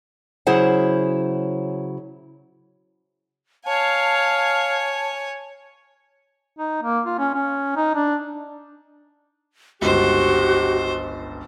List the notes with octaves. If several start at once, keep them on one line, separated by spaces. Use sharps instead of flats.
C#3 F#3 E4 G#4 C5 F#5
C#5 F5 G#5 A5
D#4
A#3
F4
C#4
C#4
D#4
D4
G1 C#2 F#4 G4 C5